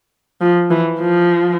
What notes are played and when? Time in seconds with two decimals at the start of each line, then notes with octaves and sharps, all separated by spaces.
0.41 F3
0.71 E3
1.00 F3